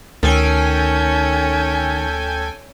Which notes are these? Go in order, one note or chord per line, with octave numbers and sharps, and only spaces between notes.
D2 D#3 C#4 A4 G5 G#5